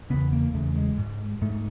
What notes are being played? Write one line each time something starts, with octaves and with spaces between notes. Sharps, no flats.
E2 C#3 B3
A#3
E2 C#3 A3
G#3
G#2
G#2 A3